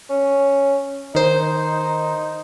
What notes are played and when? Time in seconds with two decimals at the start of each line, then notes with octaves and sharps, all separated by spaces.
0.10 C#4
1.15 D#3 D#4 C5